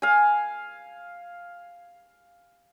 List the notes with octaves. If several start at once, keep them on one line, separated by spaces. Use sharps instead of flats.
F5 G#5